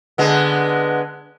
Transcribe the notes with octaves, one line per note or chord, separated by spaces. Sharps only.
D3 G#3 B3